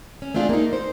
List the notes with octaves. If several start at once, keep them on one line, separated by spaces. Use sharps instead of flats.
C#4
A3 C4 D4 F4 G4 G#4
A#3 D#4
C5